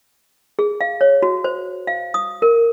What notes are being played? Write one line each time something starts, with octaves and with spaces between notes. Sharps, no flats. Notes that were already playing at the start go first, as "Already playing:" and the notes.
G#4
F5
C#5
F#4
C5
F5
D#6
A#4